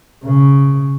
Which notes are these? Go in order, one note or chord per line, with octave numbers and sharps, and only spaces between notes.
C#3